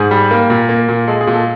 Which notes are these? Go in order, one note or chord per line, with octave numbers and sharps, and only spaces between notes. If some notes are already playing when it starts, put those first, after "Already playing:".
Already playing: G#2 G#4
G3
A#3
A#2
A#3
A#2
G#3 A4
G#4
A#2
A4